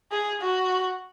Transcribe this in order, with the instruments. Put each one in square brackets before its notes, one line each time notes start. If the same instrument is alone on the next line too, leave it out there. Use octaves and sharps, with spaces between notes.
[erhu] G#4
F#4